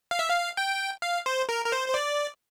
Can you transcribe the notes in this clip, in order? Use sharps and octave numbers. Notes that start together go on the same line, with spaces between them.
F5
E5
F5
G5
F5
C5
A#4
A#4
C5
C5
D5